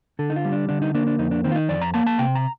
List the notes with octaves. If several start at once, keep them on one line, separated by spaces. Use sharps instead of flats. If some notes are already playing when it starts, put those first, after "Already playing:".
D3 A4
D#4
F4
G3
D4
D3 D4
D#4
A#3 D4
D4
F2 D#4
D4
D#3 C4
F4
D#4
F2 D5
A#5
A#3 A5
A5
C3 G5
A#5